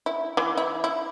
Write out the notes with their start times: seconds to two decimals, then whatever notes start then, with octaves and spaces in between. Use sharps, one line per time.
0.06 E4
0.37 E3
0.57 E4
0.84 E4